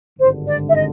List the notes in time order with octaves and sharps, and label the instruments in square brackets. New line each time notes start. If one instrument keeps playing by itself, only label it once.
[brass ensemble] G#1 G2 D3 [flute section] C5
[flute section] D5
E5
D#5